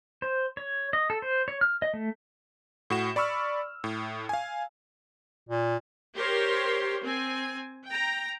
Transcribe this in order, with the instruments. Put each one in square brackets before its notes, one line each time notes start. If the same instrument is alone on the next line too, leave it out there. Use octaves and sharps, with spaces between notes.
[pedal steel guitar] C5
C#5
D#5
A4
C5
C#5
F6
D#5
A3
[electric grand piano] A2 F#4 E7
D5 B5 C#6 E6 F6
A2
F5 G#5
[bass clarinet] A#2
[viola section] G4 A#4 C5 C#5 C6
C4 G#5
G5 A#5